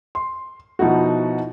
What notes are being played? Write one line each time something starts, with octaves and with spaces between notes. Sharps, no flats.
C6
B2 F3 D#4 E4 F#4